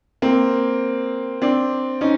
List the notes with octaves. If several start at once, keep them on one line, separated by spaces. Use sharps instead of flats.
A#3 C4
C4 D4
C#4 D#4